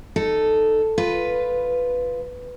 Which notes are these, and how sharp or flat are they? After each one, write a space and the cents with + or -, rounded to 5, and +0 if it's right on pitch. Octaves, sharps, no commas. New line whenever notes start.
D#4 -15 A4 +0
F4 +0 B4 +0